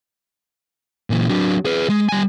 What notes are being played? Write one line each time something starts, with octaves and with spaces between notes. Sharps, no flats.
A#2 E3
F#3 D4
G#4 B4
G#3
G3 G#5